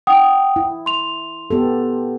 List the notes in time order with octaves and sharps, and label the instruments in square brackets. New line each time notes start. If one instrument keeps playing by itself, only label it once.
[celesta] F#5 G5 D#6
[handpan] E4
[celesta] C6 F7
[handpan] B3 G4 A4